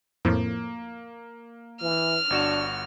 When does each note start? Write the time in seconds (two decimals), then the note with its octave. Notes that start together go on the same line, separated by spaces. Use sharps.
0.25 F2 A2 F3 A#3
1.82 E3 F6
2.30 G1 D4 F#4 E7